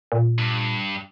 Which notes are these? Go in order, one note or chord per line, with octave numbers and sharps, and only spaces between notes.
A#2
G2